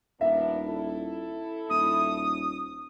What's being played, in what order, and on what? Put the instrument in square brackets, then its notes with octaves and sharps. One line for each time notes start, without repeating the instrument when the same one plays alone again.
[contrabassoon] D#1 [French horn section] B3 D4 A#4 [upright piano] E5
[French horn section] E4 A4
[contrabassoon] D#1 [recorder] D#6